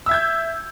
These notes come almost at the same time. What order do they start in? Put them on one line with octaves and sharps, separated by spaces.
E6 E5 G#6 G6